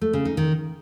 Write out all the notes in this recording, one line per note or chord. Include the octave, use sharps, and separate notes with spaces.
A3
C#3
D#4
D#3